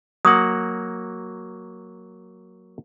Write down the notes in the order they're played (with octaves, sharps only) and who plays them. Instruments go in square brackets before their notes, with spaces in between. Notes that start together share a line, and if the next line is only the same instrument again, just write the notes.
[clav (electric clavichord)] F#3 A#3 F#5 [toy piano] D#6